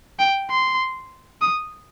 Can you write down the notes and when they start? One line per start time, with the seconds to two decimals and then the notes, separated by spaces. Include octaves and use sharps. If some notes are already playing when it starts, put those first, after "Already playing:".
0.19 G5
0.50 C6
1.41 D#6